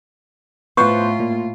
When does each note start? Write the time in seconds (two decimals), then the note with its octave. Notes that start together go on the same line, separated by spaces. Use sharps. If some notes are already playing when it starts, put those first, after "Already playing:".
0.77 A2 B3 F4 C5 F#5 C#6
1.20 A#2